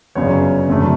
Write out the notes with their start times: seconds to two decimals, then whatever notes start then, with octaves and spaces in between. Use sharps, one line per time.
0.15 G1 F#2 C#3 C#5
0.68 F#1 F#2 D3 A3